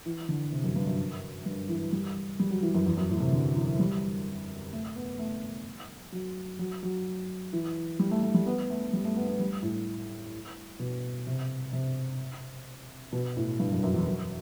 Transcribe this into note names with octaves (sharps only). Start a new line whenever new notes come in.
E3
D3
C3
F#2
G2
F#2
G2
E3
G3
G3
F#3
E3
F#2
E2
F#2
A2
C3
D3
E3
G3
A3
B3
A3
F#3
F#3
F#3
E3
G3
A3
A3
G3
B3
A3
G3
A3
B3
B3
G3
A2
B2
C3
C3
B2
A2
G2
F#2
F#2
E2
F#2